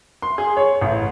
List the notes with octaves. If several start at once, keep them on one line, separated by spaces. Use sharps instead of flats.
C6
G#4
C#5
A1